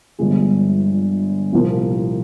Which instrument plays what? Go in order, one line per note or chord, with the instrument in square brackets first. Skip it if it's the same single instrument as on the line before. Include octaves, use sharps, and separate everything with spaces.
[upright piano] G1 G2 F3 G#3
C2 A#2 F3 A#3